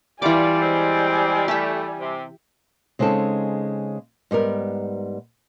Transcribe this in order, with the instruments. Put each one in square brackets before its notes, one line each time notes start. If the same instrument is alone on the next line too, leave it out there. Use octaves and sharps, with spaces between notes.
[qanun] E3 D6 [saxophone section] G3 [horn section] E4 F4 D5 [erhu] G#5
[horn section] G#3 C4
[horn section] A3 [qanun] G4 E5
[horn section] C3
[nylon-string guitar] C#3 G#3 C4 D#4 A4
G#2 G3 B3 A#4